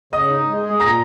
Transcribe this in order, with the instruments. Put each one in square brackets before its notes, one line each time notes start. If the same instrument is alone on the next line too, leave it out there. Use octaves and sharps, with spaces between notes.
[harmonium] C#3 [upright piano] D#5 D#6
[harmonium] D#4
G#3
G#4
[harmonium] A#2 [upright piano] A#5 A#6